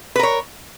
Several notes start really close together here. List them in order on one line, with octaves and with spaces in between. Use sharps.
B4 A#4 C#5